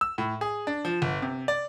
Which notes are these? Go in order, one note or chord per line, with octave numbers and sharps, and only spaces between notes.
E6
A2
G#4
D4
F3
G1
C3
D5